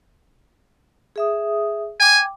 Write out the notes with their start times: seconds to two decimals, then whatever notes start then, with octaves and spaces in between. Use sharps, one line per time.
1.16 G#4 E5 D#6
2.00 G5 G#5 D6